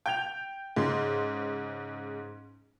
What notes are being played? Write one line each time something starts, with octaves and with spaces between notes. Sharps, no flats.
G5 G6 F7
G#2 C#3 C6